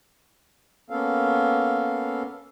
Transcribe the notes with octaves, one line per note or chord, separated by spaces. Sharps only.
A#3 B3 C#4 A4 F5